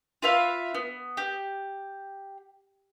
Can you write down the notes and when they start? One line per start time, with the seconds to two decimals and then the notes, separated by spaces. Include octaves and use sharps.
0.22 F4 B4 E5 F5
0.74 B3
1.17 G4